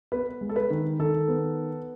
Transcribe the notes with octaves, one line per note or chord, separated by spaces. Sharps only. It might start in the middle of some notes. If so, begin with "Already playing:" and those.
B3 B4
G#3
A4
B4
D#3
D#3 A4
B3